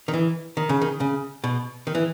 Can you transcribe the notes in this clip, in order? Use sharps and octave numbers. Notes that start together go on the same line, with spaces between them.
D#3
E3
D#3
C#3
D#3
C#3
B2
D#3
E3